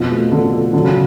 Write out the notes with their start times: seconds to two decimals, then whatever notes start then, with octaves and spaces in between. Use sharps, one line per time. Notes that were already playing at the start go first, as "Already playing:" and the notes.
Already playing: F2 B2 F3
0.11 A3
0.32 D3 F4
0.53 A4
0.73 D3 F#3
0.84 C#3